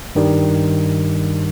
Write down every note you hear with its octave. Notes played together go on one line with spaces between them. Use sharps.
G2 D#3 G3